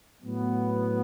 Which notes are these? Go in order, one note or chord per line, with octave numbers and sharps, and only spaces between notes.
A2 F#3 B3